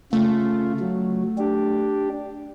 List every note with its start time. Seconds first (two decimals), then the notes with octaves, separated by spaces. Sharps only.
0.13 C#3 A3 F4
0.80 F#3
1.38 D4 G4